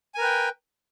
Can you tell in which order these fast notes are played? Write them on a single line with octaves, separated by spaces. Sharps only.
G#5 A#4 B4 G5